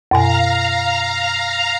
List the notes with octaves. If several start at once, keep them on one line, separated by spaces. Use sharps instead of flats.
F#2 B2 F5 G#5 A#5